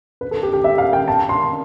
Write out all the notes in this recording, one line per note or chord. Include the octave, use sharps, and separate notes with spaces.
B4
A4
G4
G4
E5
F5
G5
A5
C6